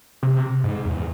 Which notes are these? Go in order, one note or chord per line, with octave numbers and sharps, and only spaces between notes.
C3
G#2
E2